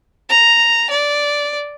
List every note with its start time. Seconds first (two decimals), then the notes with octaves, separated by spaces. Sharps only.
0.29 A#5
0.90 D5